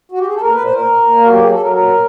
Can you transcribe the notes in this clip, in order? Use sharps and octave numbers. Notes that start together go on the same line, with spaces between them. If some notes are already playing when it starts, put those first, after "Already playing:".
F#4
G4
G#4
A4
A#2 A#4
A#2 B4
C5
A#2 A#4
A#2
A#2
A#3
F#4
F#3 G4
F#3 G#4
A4
F#3 A#4
A#2 A#4
A#2